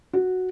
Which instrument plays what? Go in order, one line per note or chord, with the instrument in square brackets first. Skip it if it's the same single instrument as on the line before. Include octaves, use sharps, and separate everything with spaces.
[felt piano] F#4